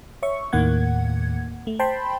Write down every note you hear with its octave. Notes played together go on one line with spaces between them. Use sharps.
C#5 E5 C#6
D#2 A2 D#3 A#3 F#5 G#6
A3
C5 G5 A5 B5 C6